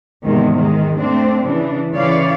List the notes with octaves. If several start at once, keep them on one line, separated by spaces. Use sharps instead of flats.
E2 G#2 C3 D#3 G#3
D#3 G#3
A3 C4 D4
C#3 E3 D4
C#3 E3 C#5 D5 F5